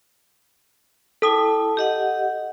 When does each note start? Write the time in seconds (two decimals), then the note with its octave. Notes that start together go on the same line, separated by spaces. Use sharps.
1.22 E4 A4 G5 A5 D#6
1.77 G4 D#5 F#5